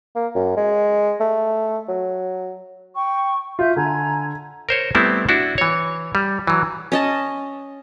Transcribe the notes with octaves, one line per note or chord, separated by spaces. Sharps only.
A#3
F#2
G#3
A3
F#3
G5 C#6
F4 E5 G6
D3 G#5 A#5 G#6
A#4 C5 C#5
G3 A3 B3 C4 E4
D4 E4 F#4
E3 C#5
G3
E3 F#3
C#4 D#5 A5